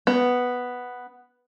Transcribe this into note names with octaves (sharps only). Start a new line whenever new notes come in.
B3